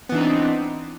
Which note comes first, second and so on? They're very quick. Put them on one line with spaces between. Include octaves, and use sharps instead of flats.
B3 E3 D4 D#4 C4